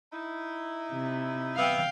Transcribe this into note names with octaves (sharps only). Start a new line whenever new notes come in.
D#4 E4
C3
B3 E5 F5 G5